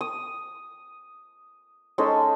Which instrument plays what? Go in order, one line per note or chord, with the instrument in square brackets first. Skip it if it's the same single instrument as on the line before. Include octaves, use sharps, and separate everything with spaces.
[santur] D#6
G#3 C#4 D#4 A4